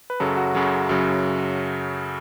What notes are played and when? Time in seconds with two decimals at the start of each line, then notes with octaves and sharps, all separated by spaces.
0.10 B4
0.20 F#2 C#3 F#3 A4
0.37 F#4
0.55 F#2 C#3 F#3
0.89 F#2 C#3 F#3